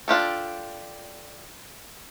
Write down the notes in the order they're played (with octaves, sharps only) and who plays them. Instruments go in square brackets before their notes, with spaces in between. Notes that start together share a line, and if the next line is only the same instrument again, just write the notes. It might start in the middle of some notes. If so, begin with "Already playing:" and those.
[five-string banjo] D4 F4 G4 A4